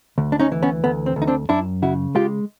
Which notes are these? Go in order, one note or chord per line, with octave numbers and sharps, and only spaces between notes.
D2
D4
C#4 D#4
E3
B3 C#4
D2 B3
C4
D2
D#4
C4 D4
F#2 D4 E4
C#3 E4 F#4
G#3 F4 G4